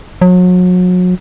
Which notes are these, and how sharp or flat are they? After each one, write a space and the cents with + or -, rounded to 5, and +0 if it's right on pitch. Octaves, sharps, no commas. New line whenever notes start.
F#3 -35